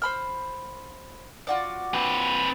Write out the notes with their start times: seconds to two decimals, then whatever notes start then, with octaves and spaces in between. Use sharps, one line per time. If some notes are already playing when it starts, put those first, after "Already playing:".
0.02 C5 B5 F6
1.47 F4 F#4 D5
1.94 C4 B4